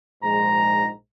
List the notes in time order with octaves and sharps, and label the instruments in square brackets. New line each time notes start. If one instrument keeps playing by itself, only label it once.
[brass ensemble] A#1 G#2 G#3 A#5